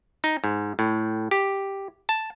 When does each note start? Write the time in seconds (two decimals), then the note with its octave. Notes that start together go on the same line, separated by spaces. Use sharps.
0.24 D#4
0.44 G#2
0.79 A2
1.31 G4
2.09 A5